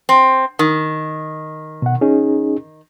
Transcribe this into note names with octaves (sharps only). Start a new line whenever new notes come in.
C4
D#3
B2 F#5
C#4 D#4 G#4